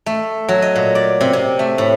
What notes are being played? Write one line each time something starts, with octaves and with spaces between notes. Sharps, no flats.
A3
F#3
D#5
A#2
D5
C3
C3
A3
A2